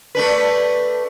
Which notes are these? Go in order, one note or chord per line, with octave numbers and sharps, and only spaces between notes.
A3 D4 B4